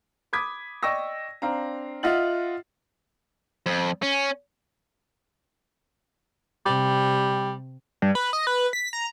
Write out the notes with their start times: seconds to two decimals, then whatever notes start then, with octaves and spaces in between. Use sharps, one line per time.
0.33 B5 D6 D#6 G#6 B6
0.83 D5 D#5 G5 C#6 E6 A#6
1.42 C4 D4 F5 A#5
2.03 F4 D#5 E5 F#5 A6 F#7
3.66 F2
4.02 C#4
6.66 C3 G3
8.02 G2
8.15 B4
8.33 D#5
8.47 B4
8.73 B6
8.93 A#5